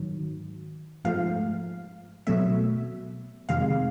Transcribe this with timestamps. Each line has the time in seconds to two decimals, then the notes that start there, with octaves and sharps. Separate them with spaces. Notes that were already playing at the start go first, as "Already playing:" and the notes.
Already playing: G#2 D#3 F#3
1.04 G#2 F3 A3 F5
2.27 B2 F#3 A3 E5
3.49 F2 C3 D#3 G#3 F5